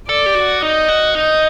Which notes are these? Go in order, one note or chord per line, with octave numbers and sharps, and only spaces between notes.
A4 D5
G4
F#4
D#4 D#5
F#4
D#4 D#5